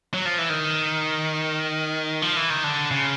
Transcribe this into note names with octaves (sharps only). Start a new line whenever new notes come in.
F#3
F3
E3
D#3
F3
E3
D#3
D3
C#3